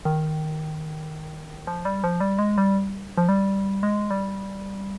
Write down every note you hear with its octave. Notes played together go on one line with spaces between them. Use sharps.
D#3
F3
G3
F3
G3
G#3
G3
F3
G3
G#3
G3